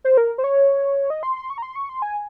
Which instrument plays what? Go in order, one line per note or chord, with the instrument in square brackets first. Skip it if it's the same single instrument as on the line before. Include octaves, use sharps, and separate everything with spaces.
[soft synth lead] C5
A#4
C5
C#5
D#5
C6
C6
C#6
A#5
C6
C#6
C6
G#5